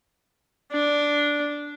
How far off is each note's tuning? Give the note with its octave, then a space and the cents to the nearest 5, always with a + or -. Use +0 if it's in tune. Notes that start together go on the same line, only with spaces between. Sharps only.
D4 -5